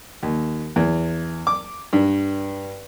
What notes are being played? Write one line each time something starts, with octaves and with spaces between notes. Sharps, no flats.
D#2
E2
D6
G2